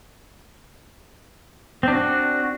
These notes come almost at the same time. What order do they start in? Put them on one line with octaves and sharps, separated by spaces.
C4 D4 F#4